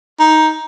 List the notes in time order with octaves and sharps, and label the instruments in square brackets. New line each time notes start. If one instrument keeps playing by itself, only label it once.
[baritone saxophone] D#4